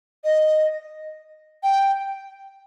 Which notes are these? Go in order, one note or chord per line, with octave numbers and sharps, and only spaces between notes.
D#5
G5